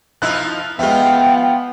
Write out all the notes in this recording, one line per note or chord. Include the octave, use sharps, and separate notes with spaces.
F3 D#4 E4 E6 F#6
F3 G#3 B3 F4 E5 G5